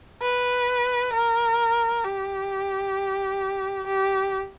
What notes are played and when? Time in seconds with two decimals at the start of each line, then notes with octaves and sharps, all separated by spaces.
0.22 B4
1.13 A#4
2.04 G4
3.87 G4